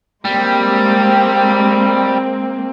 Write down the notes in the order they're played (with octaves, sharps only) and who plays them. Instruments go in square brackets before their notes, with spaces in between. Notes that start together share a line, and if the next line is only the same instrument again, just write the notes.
[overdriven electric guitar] G3 [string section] G#3 A#3 C4